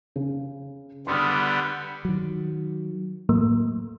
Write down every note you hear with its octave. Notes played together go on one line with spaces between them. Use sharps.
C#3
D3 G3 B3 C6 D#6 F6
D#3 F#3
A2 E3 F#3 A3 A#3